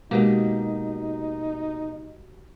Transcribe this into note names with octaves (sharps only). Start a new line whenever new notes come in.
B2 G#3 A#3 D#4 F#4 G4 B4